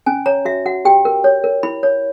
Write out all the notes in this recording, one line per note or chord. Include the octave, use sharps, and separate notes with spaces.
C#4 G#5
C#5 A#5
F#4 E5
F#4 F#5
G4 G5
A#4
C#5
A#4
E4 B5
C#5